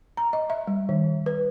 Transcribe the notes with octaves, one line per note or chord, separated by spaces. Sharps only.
A#5
D#5
E5
G3
D#3
B4